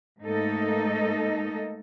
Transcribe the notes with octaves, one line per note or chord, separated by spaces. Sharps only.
G#2 A3 A#3 D#4 A4 D#5